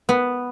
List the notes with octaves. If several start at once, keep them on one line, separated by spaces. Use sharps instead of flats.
B3